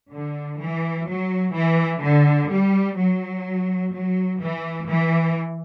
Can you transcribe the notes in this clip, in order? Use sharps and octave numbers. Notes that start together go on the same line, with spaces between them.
D3
E3
F#3
E3
D3
G3
F#3
F#3
E3
E3